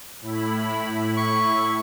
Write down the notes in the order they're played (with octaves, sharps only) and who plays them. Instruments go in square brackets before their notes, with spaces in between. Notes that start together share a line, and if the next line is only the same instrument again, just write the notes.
[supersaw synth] A2 E4 B5
[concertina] C#6